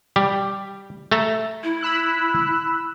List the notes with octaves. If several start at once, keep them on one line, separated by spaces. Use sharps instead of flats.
G3 G4
A3 A4 A#5
E4
B5 E6 F#6